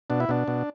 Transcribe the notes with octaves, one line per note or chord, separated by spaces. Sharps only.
B2 D4
E4
B2 D4
B2